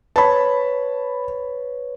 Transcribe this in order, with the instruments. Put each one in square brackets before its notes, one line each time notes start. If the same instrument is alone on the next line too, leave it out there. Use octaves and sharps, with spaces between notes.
[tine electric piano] B4 C#5 [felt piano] A5 B5